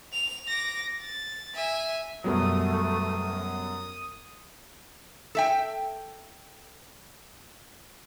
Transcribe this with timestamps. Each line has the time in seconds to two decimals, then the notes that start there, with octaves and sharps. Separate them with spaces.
0.13 F7
0.48 D6 A#6
1.02 A6
1.55 E5 G#5
2.24 F#2 B2 F#3 G3 A3 B3 D#6
5.35 A4 E5 G5